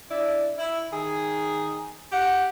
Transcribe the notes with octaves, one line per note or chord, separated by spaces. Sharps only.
D4 E4 D5
E4
D#3 G#4
G4 F#5